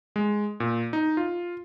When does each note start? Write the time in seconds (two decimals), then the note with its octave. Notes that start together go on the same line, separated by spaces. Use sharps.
0.16 G#3
0.60 A#2
0.93 D#4
1.17 F4